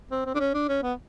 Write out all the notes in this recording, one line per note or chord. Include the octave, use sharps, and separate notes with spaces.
C4
C4
D4
C#4
D4
C#4
B3